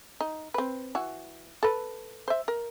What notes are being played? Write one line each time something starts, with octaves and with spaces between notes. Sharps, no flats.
D#4
C4 B4
E3 F#4
A4 B4
C5 E5
A#4